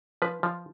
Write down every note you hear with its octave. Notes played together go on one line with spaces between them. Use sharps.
F3 B4
F3